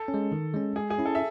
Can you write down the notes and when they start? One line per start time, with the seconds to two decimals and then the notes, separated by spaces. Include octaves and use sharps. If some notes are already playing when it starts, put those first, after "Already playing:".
Already playing: A4
0.08 C#4
0.14 G#3
0.32 D#3
0.54 G#3 C#4
0.76 G#3 G#4
0.90 G#4
0.98 C#4 E4
1.06 A4
1.15 E5